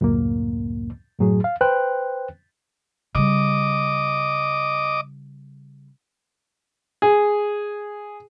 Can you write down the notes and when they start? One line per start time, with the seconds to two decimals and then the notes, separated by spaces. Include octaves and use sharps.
0.01 C#2 F#2 A2 A#3
1.19 F#2 A2 F#3 G#4
1.44 F5
1.61 B4 C5 G5 F#6
3.15 C#3 G3 D#5 D6
7.02 G#4